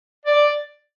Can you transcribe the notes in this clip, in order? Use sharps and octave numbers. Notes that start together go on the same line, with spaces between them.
D5